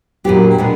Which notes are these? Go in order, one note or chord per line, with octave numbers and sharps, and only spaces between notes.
A#2 F#3 B3 D4 G4
B2 G#3 B3 D4